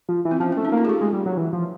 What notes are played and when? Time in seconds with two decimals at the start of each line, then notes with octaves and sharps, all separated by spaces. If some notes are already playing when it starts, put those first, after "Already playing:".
0.09 F3
0.25 E3
0.31 C4
0.40 F3 C#4
0.52 C#4
0.57 A3
0.65 D#4
0.72 A#3
0.77 F4
0.85 G#4
0.89 A3 G4
1.01 G#3
1.13 G3
1.26 F#3
1.37 E3
1.53 F3